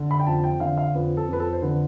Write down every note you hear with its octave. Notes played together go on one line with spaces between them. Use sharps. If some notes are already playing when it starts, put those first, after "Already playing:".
Already playing: D3
B5
G5
F2 A5
G5
D3 F5
F5
F2 B4
A4
F2 B4
A4
C5
D3 B4